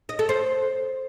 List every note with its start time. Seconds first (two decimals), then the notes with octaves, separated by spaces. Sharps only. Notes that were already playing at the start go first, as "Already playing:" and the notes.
0.09 D#5
0.19 A4
0.29 C5